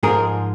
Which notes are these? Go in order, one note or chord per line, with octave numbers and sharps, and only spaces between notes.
G#2 F3 G#3 G#4 A#4